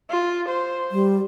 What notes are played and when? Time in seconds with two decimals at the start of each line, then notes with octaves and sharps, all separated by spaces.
0.10 F4
0.48 C5
0.91 G3